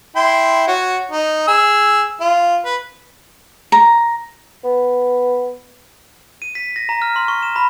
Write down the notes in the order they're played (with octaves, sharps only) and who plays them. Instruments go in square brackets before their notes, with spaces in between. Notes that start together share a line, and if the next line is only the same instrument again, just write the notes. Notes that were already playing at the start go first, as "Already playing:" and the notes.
[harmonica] E4 G5 C6
F#4 C#5
D#4
G#4 E6
F4
B4
[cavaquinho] A#5
[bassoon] B3
[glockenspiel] D#7
B6
A#6
A#5
F6
C6
C#6
E7
B5